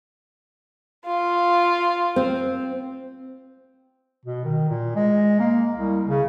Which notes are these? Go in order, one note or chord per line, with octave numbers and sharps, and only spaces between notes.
F4
C4
B2
D#3
A#2
G#3
A#3
C2
C#3